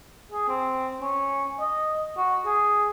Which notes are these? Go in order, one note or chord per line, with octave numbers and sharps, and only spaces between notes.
G#4
C4
C#4
D#5
F#4
G#4